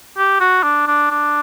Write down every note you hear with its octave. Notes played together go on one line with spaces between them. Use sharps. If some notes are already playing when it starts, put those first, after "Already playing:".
G4
F#4
D4
D4
D4